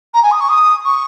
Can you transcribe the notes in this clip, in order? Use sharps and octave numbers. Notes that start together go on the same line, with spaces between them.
A#5
G#5
D#6
C#6
D#6
C#6